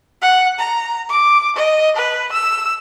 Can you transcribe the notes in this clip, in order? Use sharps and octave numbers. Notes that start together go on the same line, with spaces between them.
F#5
A#5
D6
D#5
B4
E6